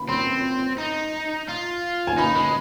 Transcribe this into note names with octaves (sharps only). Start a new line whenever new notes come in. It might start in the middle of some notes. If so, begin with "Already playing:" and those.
Already playing: B5
C4 C6
D#4
F4
G#5
D#4 B5
G#3 B5